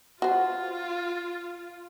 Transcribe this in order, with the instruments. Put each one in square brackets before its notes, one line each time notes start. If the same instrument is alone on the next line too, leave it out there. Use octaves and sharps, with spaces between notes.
[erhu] F4 [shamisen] F#4 C5